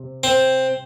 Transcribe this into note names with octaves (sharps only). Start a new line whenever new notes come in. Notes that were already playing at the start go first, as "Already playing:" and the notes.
Already playing: C3
C4